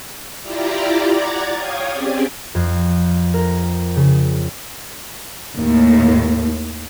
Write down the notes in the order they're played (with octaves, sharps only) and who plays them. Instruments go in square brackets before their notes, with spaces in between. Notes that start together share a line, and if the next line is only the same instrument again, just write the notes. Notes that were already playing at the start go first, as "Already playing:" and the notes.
[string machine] E4 F4 G4 D5 A#5
D5 F#5 A#5 D6 G#6 A6
C#5 F5 G5 D#6 G#6
C4 C#4 G4 G#4 D5
[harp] F2
A#4
C#3
[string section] D#2 A2